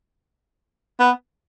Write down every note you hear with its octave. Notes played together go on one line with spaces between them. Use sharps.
B3